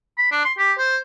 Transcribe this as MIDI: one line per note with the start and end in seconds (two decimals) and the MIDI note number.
0.18 0.29 83
0.32 0.43 62
0.45 0.53 84
0.58 0.73 67
0.78 0.97 72